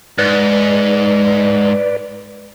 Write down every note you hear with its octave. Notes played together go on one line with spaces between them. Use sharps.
G#2 B4 D5